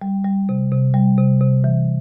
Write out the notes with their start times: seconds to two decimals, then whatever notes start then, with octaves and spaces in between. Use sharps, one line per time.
0.02 G3
0.25 G3
0.49 C3
0.72 C3
0.94 G3
1.18 C3
1.41 C3
1.64 E3